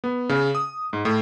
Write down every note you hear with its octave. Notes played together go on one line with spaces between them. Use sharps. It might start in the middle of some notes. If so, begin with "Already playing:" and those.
B3
C#3
D#6
G#2
A2